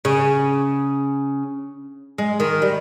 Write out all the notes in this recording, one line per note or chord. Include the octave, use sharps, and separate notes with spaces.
C#3
G#3
D#3
G3